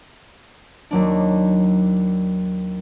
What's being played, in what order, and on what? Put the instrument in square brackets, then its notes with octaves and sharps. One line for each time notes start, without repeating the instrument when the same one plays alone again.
[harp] D#2 F#3 D4